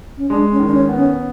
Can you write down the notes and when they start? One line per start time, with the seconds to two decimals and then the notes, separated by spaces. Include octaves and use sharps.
0.17 C#4
0.29 G#3 D4
0.51 C#4
0.59 D#3
0.67 D4
0.74 C#4
0.89 B3
0.96 C#4